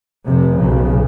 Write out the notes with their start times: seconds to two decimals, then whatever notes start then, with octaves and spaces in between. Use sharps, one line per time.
0.25 F1 C3
0.57 B1 C#3